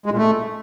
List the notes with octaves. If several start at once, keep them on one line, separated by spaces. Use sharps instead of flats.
G#3
A#2
A3